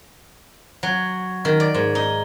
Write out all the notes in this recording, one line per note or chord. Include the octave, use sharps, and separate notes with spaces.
F#3
D#3
D5
G#2
D#4